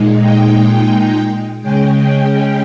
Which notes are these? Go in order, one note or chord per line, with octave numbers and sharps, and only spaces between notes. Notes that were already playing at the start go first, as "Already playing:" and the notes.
Already playing: A#2 G#3 D#4
G5
C#3 G#3 C#4 G5
G5